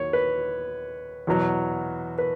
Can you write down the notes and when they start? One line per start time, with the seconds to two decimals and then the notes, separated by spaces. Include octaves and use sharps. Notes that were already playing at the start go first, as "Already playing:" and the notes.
Already playing: D#2 F#3 C#5
0.13 B4
1.27 E2 B2 F#3
2.18 B4